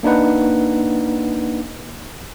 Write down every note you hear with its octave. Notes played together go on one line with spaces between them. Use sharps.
A#3 D4 D#4 B4 F#5